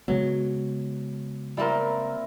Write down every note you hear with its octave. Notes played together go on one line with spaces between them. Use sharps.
C#3 F#3 G#3 B3
G3 A#3 C4 E4 A#4